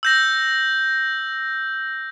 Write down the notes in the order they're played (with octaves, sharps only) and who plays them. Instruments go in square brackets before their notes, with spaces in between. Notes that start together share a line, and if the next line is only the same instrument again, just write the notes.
[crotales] E6 G6 A#6